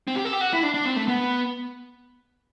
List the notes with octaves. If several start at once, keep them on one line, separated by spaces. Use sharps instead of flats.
C4
G4
A4
G4
F#4
E4
D4
D4
C4
A3
B3